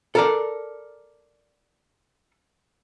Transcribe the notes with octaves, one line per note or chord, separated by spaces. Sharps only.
A4 A#4 D5